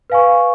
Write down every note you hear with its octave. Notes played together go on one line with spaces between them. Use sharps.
B4 F5 G#5 C#6